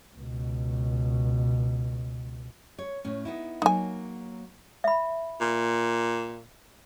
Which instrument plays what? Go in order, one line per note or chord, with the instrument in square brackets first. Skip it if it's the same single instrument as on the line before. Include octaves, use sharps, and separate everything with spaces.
[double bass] C#2 B2
[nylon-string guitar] C#5
A2 C#4
B3 D#4 E4
[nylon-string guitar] F#3 A#3 [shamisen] D#4 G#5
[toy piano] E5 B5
[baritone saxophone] A#2